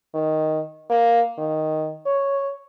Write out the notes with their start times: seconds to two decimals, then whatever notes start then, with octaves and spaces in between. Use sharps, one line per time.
0.14 D#3
0.90 A#3
1.38 D#3
2.06 C#5